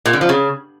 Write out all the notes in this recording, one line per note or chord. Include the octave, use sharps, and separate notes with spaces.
A#2
D3
F3
C#3